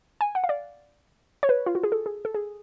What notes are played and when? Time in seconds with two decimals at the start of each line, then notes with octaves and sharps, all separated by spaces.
0.21 G#5
0.35 F#5
0.44 F5
0.49 D5
1.43 C#5
1.49 B4
1.66 F4
1.75 F#4
1.83 G#4
1.92 A4
2.06 G#4
2.25 A4
2.34 G#4